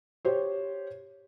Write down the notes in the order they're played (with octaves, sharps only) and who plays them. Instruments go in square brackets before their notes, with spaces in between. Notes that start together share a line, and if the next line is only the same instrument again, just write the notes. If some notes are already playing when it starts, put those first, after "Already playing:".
[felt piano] G4 C5 C#5